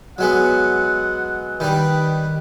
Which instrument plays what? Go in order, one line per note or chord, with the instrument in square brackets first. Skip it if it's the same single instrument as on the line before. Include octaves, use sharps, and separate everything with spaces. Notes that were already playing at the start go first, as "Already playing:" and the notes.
[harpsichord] F#3 G#3 B3 [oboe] F#5
[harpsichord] D#3 G3 [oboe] B4